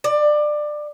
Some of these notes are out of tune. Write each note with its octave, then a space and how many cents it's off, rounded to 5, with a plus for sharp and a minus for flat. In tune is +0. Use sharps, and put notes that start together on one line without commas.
D5 +20